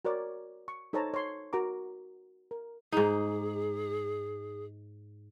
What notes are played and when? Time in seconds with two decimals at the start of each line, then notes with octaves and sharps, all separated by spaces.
0.05 F#4 A#4 C#5 D5
0.68 C#6
0.93 D#4 A4 C5 C#5 A5 A#5
1.14 C#5 C6
1.53 F#4 A#4 A#5 D6
2.51 A#4
2.92 G#2 D#4 G#4